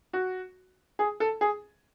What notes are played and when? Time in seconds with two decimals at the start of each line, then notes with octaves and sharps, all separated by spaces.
0.13 F#4
0.99 G#4
1.20 A4
1.41 G#4